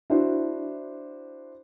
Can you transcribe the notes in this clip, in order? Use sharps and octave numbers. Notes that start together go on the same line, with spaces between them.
D4 E4 F#4 C5